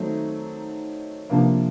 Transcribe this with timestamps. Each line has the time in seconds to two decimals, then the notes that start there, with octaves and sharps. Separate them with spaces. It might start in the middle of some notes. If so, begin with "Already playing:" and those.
Already playing: D#3 F#3 A3 C4 D#4
1.29 C3 F3 A#3 D4